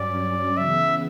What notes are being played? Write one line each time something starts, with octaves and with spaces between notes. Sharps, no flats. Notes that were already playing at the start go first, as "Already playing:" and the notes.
Already playing: G2 F#3 C#4 D5
C#3 E3 B3 E5